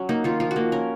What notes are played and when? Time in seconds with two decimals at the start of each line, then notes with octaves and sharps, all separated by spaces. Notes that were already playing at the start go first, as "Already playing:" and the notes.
Already playing: F#3 C#4
0.09 A#3 D#4
0.24 D#3 F4
0.40 F3 F4
0.51 F#4
0.56 A#3
0.72 C#4 A#4